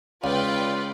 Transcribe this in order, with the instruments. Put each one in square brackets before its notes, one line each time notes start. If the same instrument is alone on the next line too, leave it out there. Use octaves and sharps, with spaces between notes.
[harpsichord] C#2 [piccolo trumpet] F4 [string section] B4 D5 G5